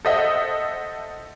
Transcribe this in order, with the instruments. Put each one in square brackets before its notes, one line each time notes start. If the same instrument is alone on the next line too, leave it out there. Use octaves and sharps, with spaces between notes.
[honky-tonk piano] A4 C5 D#5 E5 F#5